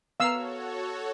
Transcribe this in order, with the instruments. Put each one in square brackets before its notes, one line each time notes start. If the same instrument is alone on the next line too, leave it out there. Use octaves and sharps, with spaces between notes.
[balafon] B3 B4 A#5 [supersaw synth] F#4 A4 C#5 [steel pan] F5 E6